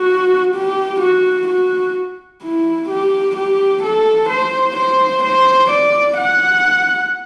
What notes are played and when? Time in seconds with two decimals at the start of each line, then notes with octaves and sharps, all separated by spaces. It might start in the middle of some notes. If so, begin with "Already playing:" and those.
Already playing: F#4
0.55 G4
1.01 F#4
1.48 F#4
2.42 E4
2.89 G4
3.36 G4
3.83 A4
4.29 C5
4.77 C5
5.24 C5
5.71 D5
6.17 F#5